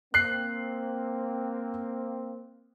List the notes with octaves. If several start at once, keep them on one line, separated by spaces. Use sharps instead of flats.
A#3 C4 F#6 C7